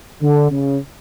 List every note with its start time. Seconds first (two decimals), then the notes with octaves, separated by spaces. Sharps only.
0.21 D3
0.50 C#3